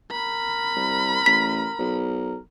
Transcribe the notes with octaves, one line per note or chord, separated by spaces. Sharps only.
A#4 B5
C2
A1 B6
B1